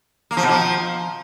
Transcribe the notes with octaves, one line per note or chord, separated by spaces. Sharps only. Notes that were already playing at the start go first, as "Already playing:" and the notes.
A#3
F3
B2
F3